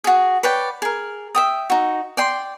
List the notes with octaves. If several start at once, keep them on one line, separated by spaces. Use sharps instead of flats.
F#4 G#4
B4 C#5 D5 G5
G#4 A#4
E5 G5 D#6
D#4 F#4
D5 G5 C6